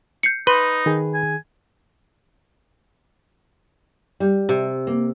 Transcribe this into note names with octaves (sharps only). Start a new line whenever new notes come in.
G6 C7 C#7
D#4 B4 C6
D#3 G#4
G#5
G3
C3
A#3